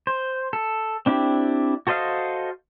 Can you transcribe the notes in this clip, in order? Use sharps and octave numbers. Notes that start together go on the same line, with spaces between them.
C5
A4
C4 D4 E4 G4
F#4 A4 C5 D#5 F5